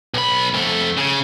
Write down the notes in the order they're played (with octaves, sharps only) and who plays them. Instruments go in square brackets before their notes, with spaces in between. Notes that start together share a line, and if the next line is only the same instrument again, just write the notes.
[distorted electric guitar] B1 B5
F2 A3
C#3